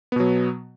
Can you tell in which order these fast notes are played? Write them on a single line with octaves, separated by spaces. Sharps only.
B3 B2 F#3